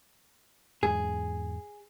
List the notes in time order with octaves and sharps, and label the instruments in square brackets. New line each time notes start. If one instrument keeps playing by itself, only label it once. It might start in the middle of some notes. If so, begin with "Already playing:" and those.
[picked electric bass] E2 G#2 [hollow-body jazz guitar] G#4